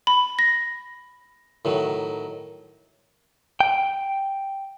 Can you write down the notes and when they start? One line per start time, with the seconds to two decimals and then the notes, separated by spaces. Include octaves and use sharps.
0.07 B5
0.39 A#6
1.65 A2 D#3 F#3
3.60 G5